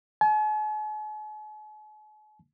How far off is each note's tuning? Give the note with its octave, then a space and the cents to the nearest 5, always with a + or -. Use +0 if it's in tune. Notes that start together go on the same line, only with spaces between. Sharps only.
G#5 +45